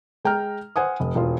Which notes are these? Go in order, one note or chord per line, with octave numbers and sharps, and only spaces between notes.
G#3 G5 A#5 F6
C5 F#5 G#5 D#6
F1
E1 F4